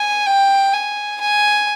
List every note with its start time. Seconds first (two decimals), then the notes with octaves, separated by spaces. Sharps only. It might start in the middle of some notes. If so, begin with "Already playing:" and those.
Already playing: G#5
0.26 G5
0.73 G#5
1.20 G#5